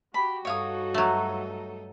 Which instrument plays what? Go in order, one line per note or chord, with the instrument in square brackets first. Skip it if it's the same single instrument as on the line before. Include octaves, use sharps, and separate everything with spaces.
[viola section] F#4 [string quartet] G4 [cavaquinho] B5
[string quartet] G2 D#4 A4 [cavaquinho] C#5 F5 D#6
[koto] F#3 A3